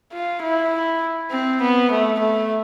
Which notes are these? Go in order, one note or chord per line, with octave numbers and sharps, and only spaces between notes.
F4
E4
C4
B3
A3
A3